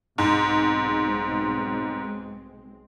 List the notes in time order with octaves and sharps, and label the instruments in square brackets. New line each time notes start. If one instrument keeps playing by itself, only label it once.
[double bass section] B1 G#3 C4 [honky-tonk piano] G#2